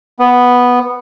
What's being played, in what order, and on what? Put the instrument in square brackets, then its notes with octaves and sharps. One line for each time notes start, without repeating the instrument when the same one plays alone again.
[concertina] B3